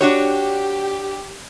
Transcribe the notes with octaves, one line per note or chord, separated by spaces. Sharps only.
D4 F#4 G4 C#5